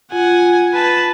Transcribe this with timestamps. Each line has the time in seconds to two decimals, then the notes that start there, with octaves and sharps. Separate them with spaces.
0.12 F4 F#5 G#5
0.74 B4 A5